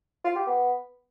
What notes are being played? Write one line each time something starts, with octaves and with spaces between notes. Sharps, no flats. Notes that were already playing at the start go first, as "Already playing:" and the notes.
F4
G4
B3